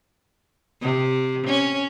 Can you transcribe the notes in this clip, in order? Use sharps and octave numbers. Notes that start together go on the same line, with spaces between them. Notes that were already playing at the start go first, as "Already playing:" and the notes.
C3
C#4